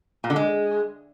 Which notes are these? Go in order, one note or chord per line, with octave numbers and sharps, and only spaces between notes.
A#2
D3
G#3